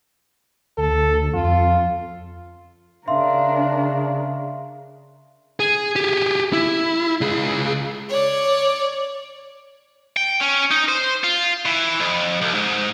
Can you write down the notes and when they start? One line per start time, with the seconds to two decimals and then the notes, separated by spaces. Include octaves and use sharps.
0.77 D2 A4
1.34 F2 F4
3.08 C#3 D4 A#4 E5 F5 C6
5.60 G#4
5.96 G4 G#4
6.53 E4
7.21 C#2 G#4
8.09 C#5 D5
10.17 G5
10.41 C#4
10.71 D#4
10.89 C5
11.24 F4
11.65 E3
12.00 F2
12.41 C2
12.54 G#2